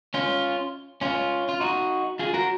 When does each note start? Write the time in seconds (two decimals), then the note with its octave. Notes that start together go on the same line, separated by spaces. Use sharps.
0.14 C#4 F4
1.01 C#4 F4
1.49 F4
1.60 D#4 F#4
2.19 F4 G#4
2.34 F#4 A#4